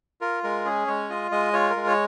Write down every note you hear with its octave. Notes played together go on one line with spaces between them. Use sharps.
F4 A#4
G#3 A#4
C#4 G#4
G#3 C#5
F4 D#5
G#3 D#5
F4 C#5
A#4
G#3
C#5